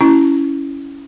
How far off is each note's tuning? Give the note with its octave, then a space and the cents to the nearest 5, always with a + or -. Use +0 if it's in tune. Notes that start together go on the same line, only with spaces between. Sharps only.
C#4 +10 E4 +0